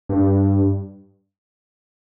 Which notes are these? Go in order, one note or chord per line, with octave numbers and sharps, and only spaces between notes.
G2